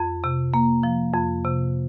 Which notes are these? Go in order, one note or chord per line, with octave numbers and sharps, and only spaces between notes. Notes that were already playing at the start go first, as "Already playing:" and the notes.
Already playing: F2
C3
A#3
F3
F2
C3